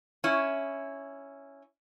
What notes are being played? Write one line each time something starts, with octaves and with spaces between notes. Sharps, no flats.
C#4 E4